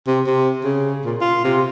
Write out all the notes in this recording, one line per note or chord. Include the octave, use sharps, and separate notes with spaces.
C3
C3
C#3
A#2
F4
C3